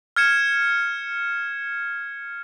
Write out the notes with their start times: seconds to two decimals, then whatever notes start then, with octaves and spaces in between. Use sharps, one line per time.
0.16 F6 G#6 C#7 E7